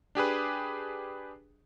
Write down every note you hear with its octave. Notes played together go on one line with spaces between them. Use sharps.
D4 G4 G#4 B4